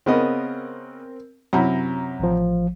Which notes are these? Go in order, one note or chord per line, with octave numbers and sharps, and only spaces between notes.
C#3 B3 C4 A#4 D#5
F#2 C3 E4 A#5
A1 F3